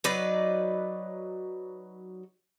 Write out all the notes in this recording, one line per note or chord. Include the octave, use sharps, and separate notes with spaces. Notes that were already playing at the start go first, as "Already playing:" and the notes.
F#3 D#4 B4 D5